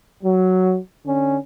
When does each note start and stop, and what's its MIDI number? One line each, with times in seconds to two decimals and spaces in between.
0.22 0.77 54
1.05 1.37 50
1.05 1.37 61